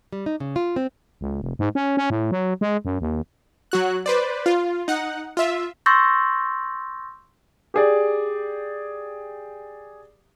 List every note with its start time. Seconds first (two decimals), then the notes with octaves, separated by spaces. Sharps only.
0.12 G3
0.26 D#4
0.40 C#3
0.56 F4
0.76 C4
1.21 C#2
1.42 F1
1.59 G#2
1.75 C#4
1.97 C#4
2.10 A2
2.31 F#3
2.61 G#3
2.85 F#2
3.01 D#2
3.72 F#3 F#4 F#6
4.06 B4 C5 D5
4.46 F4
4.88 D#4 F#5
5.37 F4 E5
5.86 C6 C#6 E6 G6 A6 A#6
7.74 G4 G#4 D5